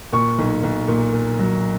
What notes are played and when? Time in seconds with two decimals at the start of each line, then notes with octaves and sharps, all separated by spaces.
0.13 A#2 C#6
0.38 B1
0.63 B1
0.88 A#2
1.13 A#2
1.39 F#3